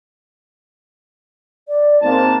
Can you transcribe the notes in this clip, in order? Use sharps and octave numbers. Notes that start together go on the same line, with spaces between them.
D5
G#2 A#3 C4 A5